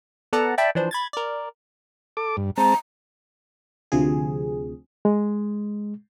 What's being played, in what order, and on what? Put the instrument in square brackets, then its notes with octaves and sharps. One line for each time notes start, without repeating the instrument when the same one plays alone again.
[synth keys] B3 A4 D5 F#5 A5 A#5
D5 E5 G5 A5 B5
E3 F3 D4 C5
B5 G#6 A6
A#4 D5
[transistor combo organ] A4 D6
G2
[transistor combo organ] G#3 C4 A5 [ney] A#5
[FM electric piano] D2 C3 F3 G#4
[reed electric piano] G#3